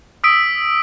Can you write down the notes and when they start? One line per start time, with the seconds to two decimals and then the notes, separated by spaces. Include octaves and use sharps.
0.24 D#6 E6 B6 D7